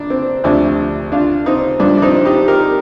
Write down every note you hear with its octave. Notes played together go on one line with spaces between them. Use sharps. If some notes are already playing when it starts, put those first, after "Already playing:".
Already playing: A#1 D4
C4
D2 C3 F3 D4
D4 F4
C4 D#4
G2 F3 D4
D4
C4 D#4
D#4 G4
G4 A#4